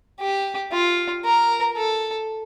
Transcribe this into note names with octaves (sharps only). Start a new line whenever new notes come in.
G4
F4
A#4
A4